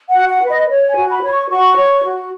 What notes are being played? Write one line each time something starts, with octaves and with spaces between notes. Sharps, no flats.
F#5
F#4
F#5
B4
D#5
C#5
G#5
F#4
B5
C#5
C#6
F#4 C#6
C#5
F#4